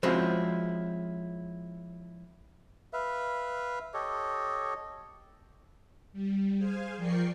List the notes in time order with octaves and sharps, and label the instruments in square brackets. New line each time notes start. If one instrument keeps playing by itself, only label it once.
[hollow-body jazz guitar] F3 G#3 C4 C#4 E4 F#4
[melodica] B4 E5 F5
G4 A4 C#5 D#5
[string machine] G3
G#4 C5 F5 G#5
F3 A#4 D5 G5 C#6 C7